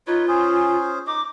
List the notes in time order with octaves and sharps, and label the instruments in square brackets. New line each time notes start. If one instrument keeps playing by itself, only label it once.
[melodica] D#4 B4 C#5 [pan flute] F4
[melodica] C#4 G#4 C5
[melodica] D#4 D#5 [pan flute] D6